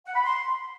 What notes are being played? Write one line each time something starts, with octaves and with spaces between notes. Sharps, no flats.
F#5
B5
C6